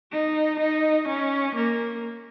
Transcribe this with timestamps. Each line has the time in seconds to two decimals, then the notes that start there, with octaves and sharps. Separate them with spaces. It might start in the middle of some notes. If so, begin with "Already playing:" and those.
0.12 D#4
0.60 D#4
1.08 C#4
1.55 A#3